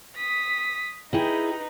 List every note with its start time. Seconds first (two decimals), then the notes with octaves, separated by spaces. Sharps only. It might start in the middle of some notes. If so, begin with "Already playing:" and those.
0.16 D#6 B6
1.13 D#4 E4 G#4 B4 G5